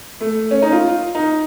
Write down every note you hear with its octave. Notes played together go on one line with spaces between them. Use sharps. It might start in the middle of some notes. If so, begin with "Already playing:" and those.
A3
C#4
D#4
F4
D#4